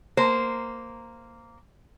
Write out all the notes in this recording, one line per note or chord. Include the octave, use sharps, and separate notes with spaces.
A#3 C5